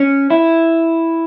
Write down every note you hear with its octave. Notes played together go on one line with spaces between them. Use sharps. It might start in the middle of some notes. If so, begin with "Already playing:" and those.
Already playing: C#4
E4